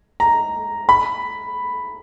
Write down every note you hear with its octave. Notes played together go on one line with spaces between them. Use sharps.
A#5
B5